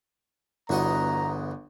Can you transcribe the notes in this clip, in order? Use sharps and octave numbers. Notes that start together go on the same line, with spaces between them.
G1 E2 F#4 D#5 A#5